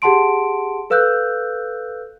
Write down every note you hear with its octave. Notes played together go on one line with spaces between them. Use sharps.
G4 G#4 F#5 A5 C6 D7
A4 B4 F5 E6 F#6 G6